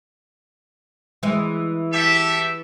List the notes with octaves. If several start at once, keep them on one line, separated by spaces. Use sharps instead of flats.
E3 G#3
G4 A4 E5